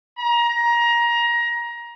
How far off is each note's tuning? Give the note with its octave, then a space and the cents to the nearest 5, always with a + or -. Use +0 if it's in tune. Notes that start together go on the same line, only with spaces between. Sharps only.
A#5 +20